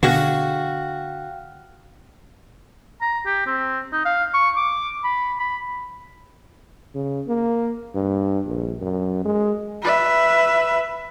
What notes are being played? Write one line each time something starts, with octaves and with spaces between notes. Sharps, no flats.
B2 D3 F#4 G#4 F5 G5 F6
A#5
G4
C4
D#4
F5
C#6
D6
B5
B5
C#3
A#3
G2
A#1
F#2
G#3
B4 E5